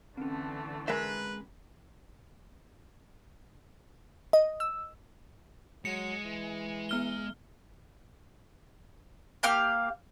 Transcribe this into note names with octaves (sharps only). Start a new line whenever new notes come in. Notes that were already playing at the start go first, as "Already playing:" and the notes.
D3 E3 A3 C4 C#4
G#3 A#4 B4 E5
D#5
E6
F#3 G#3 C#7
E3
B3 F6 G7
A#3 G4 F5 F6